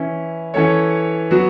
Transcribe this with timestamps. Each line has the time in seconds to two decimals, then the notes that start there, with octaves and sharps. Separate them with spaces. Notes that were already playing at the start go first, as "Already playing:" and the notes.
Already playing: E3 C#4 E4
0.54 E3 C#4 A4 C#5
1.31 F#3 B3 F#4